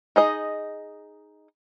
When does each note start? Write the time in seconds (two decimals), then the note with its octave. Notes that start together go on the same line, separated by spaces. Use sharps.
0.16 D#4 G#4 D#5